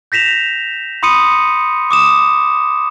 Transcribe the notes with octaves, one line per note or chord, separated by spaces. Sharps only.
G6 A#6 B6 E7 F7
B5 C6 D#6 C#7 D#7
D6 D#6 E7